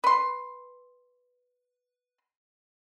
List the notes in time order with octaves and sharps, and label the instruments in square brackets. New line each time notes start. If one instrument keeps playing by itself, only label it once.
[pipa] B4 C6